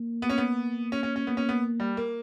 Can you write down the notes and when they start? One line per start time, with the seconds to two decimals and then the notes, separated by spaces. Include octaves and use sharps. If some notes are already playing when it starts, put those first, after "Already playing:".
Already playing: A#3
0.22 B3
0.30 C#4
0.38 B3
0.92 C#4
1.03 C#4
1.16 C#4
1.27 A#3 B3
1.37 C#4
1.49 B3
1.80 G3
1.97 A#3